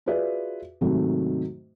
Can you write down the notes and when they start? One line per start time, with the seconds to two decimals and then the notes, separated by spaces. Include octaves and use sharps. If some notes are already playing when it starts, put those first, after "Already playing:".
0.06 F4 F#4 G#4 B4 D5 E5
0.81 G#2 C3 D#3 F#3 A3